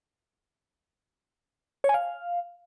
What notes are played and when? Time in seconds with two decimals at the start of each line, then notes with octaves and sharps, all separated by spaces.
1.84 C#5
1.89 G#5
1.94 F5